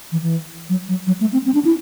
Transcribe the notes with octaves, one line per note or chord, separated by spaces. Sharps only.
E3
E3
F#3
F#3
F#3
A3
C4
C4
D4
E4